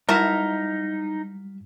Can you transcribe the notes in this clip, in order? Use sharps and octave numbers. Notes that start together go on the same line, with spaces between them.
G3 D#4 E4 F#4 A#4 A5 B6